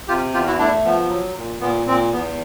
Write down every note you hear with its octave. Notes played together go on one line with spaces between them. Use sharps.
C3 F4 G4
E2 F4 G4
E4 F#4
A3 D4 E4
F3 B3
F#3
A#2
A#2 B3
A#2 C4
E2 B3